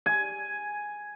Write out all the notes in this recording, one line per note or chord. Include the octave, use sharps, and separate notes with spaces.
G#5